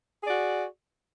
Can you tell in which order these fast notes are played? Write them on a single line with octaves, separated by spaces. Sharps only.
G#4 D5 F#4